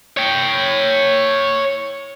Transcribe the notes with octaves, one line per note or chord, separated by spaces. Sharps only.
C#5 G5